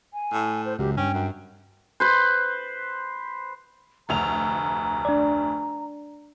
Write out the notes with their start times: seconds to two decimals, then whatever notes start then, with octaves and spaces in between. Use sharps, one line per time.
0.13 G#5
0.33 A2
0.65 C5
0.79 C#2 F#2 G4
0.97 G2 C#4 G5
1.14 F#2
2.00 B4 C5
4.09 F1 D2 A#5 F7
5.05 D4 D5